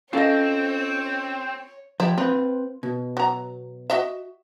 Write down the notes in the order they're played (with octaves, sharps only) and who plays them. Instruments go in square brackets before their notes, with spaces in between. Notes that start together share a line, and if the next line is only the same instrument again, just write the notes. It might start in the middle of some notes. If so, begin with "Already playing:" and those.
[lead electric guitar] C4 [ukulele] C#4 D#5 [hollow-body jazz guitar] F4 A4 F5 [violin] C#5
[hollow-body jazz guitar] F3 G4 [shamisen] E4
[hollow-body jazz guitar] C4 B4 [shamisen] F4
[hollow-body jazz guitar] B2
[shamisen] F#3 A#5
F#4 D#5 E5